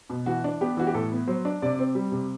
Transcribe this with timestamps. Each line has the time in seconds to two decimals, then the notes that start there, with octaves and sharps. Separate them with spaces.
0.10 B2
0.26 E3 F#4
0.44 D4
0.61 B3 G4
0.77 E3 F#4
0.87 G4
0.94 A2 A4
1.12 B3
1.27 F#3 C5
1.45 D4
1.62 C3 D5
1.79 C4
1.95 G3
2.12 C3